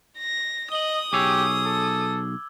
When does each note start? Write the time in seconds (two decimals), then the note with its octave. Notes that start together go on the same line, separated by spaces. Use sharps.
0.18 A#6
0.72 D#5 D#6 F#7 G7
1.13 B1 G4 G#4 C#5 D6 E6 G#6
1.66 A4